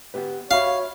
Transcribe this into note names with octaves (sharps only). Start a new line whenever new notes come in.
B3 G4 B4
F#4 C#5 E5 F5 B5